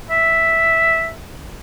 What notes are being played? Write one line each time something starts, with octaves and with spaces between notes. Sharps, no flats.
E5